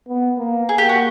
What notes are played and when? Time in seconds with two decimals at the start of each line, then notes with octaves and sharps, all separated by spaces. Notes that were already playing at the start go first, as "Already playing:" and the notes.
0.08 B3
0.39 A#3
0.69 G#4
0.78 G4
0.89 F#4